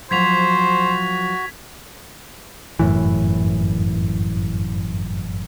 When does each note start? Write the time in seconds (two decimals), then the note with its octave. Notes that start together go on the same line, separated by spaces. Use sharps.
0.11 F3 F#3 F#4 C5 G#6 B6 F7
2.79 G1 F#2 A2 E3